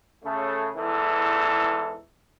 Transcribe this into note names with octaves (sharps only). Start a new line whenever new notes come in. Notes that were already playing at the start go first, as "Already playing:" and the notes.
C#3 A3
E2 G#2 E3 A4